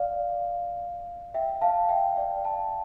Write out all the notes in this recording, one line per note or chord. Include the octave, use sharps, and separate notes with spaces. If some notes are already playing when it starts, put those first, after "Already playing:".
Already playing: D5 F5
E5 G5
F5 A5
E5 G5
D5 F5
F5 A5